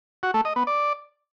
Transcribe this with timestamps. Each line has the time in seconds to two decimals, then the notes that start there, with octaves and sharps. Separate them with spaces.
0.23 F#4
0.34 A3
0.45 D#5
0.56 B3
0.67 D5